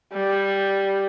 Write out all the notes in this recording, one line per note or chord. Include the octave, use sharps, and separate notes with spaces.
G3